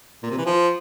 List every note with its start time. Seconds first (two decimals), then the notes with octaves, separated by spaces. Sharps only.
0.23 A#2
0.31 C3
0.38 E3
0.46 F3